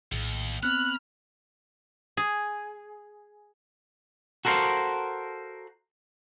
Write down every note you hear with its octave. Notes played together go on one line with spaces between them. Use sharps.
A#1 D#2 A2
B3 C4 B5 F6 F#6
G#4
F#4 A4 A#4 C5 F5